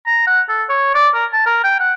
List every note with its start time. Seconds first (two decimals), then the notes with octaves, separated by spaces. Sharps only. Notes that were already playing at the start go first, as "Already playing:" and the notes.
0.07 A#5
0.27 F#5
0.49 A4
0.70 C#5
0.95 D5
1.15 A#4
1.33 A5
1.46 A#4
1.64 G5
1.80 F#5